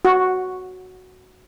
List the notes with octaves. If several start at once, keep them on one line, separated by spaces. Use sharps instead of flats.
F#4